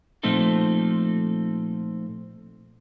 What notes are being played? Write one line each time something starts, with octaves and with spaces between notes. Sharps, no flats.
A#2 F3 A3 C4 D#4 A4